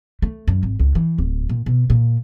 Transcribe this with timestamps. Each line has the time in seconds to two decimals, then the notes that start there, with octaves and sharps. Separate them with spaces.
0.22 A3
0.48 F#2
0.63 G#1
0.79 C#2
0.95 E3
1.18 D1
1.49 A#2
1.66 B2
1.90 A#2